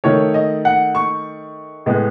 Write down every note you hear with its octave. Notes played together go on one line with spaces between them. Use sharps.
D#3 A3 C#5
D#5
F#5
C#6
A2 G#3 B3